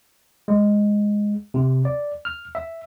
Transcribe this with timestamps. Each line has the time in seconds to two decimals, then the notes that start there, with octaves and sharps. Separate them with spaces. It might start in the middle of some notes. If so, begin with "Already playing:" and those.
0.48 G#3
1.54 C3
1.85 D5
2.25 F6
2.55 E5